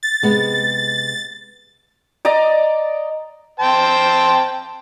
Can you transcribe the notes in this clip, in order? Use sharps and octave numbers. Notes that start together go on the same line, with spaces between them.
A6
C3 G#3 B3
D5 D#5 A#5
C5 G5 A5